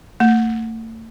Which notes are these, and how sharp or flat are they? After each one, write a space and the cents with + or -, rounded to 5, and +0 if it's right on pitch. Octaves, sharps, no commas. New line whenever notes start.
A3 +40